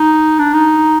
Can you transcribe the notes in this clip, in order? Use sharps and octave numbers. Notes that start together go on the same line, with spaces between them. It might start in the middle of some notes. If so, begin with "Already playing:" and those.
Already playing: D#4
D4
D#4